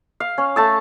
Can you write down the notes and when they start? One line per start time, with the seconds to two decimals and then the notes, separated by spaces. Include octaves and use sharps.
0.20 F5
0.38 C#4
0.56 A3 A5 E6